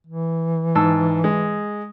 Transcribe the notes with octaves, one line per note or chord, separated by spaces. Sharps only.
E3
G#2 A5 E6
G#3